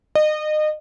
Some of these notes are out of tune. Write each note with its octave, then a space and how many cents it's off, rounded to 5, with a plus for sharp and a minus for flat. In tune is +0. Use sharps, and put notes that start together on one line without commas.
D#5 -30